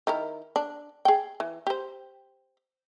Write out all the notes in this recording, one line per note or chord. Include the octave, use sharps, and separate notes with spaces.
D#3 E4 A#4
D4
G#4 G5
E3
G4 C5